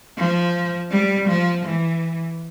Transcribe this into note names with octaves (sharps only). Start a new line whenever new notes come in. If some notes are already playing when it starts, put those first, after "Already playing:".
F3
G3
F3
E3